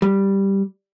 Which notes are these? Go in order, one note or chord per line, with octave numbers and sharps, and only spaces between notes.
G3